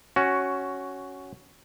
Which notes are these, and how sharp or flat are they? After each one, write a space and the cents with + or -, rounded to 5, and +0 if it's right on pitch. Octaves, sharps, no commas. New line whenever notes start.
C#4 +0 F#4 +10